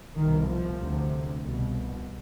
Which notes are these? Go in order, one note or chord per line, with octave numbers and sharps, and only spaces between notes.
C2 B2 D#3
F3
D2 C3
C2 B2